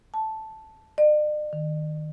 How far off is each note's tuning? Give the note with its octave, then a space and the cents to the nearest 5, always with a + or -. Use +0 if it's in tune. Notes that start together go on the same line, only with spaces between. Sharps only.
A5 -5
D5 +45
D#3 -10